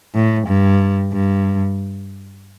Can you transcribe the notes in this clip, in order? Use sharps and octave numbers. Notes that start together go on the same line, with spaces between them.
A2
G2
G2